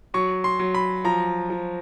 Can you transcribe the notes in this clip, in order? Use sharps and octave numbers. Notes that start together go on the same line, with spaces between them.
F#3 C#6
C6
F#3
B5
F3 A#5
F3